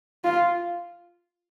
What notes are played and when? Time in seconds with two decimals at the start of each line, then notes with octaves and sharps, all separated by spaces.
0.24 F4